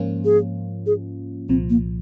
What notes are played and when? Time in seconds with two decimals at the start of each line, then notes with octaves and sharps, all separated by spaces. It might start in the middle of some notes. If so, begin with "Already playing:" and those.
Already playing: G#2 F3 A#3 C#4 F4
0.25 G#4
0.86 G#4
1.49 C2 A#2 F3 C4
1.70 A#3